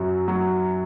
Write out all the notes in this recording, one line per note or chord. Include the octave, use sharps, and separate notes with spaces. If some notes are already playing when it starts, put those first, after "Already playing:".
Already playing: F#2 F#3
F#3